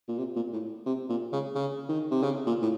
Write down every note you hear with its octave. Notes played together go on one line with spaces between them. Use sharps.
A#2
C3
A#2
A2
C3
A#2
C#3
C#3
D#3
C3
C#3
A#2
A2